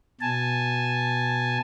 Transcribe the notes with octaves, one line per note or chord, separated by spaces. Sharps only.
B2 G#5 A5